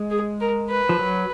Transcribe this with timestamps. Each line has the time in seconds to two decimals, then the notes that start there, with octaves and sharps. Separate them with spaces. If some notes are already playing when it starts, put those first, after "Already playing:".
Already playing: G#3
0.10 G#4
0.40 A#4
0.69 B4
0.89 F3
0.99 F#3